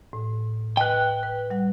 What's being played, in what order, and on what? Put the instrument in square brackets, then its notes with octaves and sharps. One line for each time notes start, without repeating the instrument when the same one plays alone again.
[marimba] A2
[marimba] B4 D#5 [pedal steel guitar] G5 F#6
[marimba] B4
G3 F#5